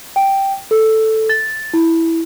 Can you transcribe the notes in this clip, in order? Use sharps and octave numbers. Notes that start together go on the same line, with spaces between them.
G5
A4
A6
E4